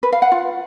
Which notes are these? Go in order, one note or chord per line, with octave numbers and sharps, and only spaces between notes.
B4
F5
F#5
F4